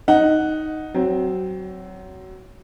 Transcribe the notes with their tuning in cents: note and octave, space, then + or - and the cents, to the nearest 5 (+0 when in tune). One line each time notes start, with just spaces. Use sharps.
D#4 +0 F#5 +0
F#3 +20 C4 +0